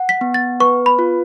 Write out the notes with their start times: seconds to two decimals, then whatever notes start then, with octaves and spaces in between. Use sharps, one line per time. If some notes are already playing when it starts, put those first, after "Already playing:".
Already playing: F#5
0.09 B6
0.21 B3
0.34 A6
0.60 B4 C#6
0.86 B5
0.99 F4